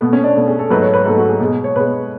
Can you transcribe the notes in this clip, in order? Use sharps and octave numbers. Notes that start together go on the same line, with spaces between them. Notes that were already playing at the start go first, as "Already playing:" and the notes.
B2 A3 B3
C#4
D4
B2 A3
G#4
A4
G#2 F#3 A3 B4
C#5
B4
G#2 F#3 A3 A4
F#4
G#4
B2 G#3
C#5
B2 G#3 B4